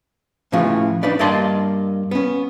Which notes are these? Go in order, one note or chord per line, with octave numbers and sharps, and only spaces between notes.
A2 C#3 E3 F3 F4 F#4
D4 D#4 B4 D5
G2 A#3 D5 D#5 A5 C6
B3 C#4